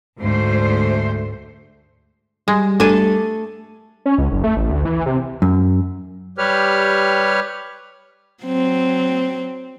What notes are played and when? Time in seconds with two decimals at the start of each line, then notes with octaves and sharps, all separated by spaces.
0.19 D2 G#2 A3 C5
2.48 G3 G#3
2.80 A3 D4 A4 G#5
4.06 C#4
4.18 C#2
4.32 F#1
4.44 A3
4.56 A1
4.70 D2
4.85 E3
5.06 C3
5.42 F#2
6.38 G3 G4 B4 C#5 F6
8.44 F#3 C4